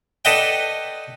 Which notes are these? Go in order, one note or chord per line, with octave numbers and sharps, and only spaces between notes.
A4 B4 D5 D#5 F#5 G5